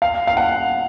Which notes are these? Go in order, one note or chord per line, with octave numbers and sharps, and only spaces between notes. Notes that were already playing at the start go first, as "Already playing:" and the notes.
F5
F5
F#5